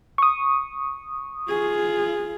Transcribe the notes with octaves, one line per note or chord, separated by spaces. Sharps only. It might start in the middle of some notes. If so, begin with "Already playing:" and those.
C#6 D#6
F4 G#4